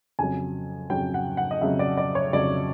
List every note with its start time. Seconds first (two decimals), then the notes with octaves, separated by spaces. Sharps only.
0.19 F2 C#3 F#3 G#5
0.90 F2 C#3 F#3 G5
1.14 F#5
1.37 F#5
1.51 D#5
1.61 F2 C#3 F#3 E5
1.79 D5
1.97 D5
2.15 C#5
2.33 F2 C#3 F#3 D5